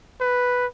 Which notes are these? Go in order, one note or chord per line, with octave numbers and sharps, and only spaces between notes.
B4